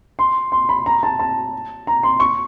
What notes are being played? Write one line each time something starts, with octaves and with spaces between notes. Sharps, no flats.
C6
C6
B5
A#5
A5
A5
A#5
C6
C#6